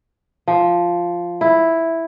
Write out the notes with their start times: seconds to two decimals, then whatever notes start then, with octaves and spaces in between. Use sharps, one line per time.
0.48 F3
1.41 E4